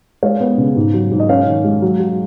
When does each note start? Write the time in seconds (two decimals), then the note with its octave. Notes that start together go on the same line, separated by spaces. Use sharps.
0.23 G#3 C#5 F5
0.40 B3
0.58 C#3
0.76 G#2
0.94 F#3
1.11 G#2
1.20 D#5
1.29 C#4 C#5 F5
1.47 D#3
1.64 G#3
1.82 F#3
2.00 F#3